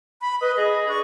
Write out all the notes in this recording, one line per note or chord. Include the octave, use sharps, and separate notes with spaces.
B5
B4 D#5
G#4 D#5
D4 C#6